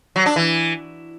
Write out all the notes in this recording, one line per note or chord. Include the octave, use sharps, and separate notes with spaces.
F#3
D4
E3